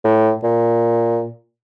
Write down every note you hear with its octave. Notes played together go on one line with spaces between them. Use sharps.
A2
A#2